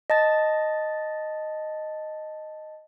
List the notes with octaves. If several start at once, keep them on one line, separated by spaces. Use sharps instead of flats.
D#5 A5 A6